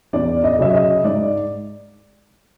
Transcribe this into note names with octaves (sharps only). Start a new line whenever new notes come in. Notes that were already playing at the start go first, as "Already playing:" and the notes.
E2 D5
D#5
C#3 F#3 E5
D#5
G#2 D5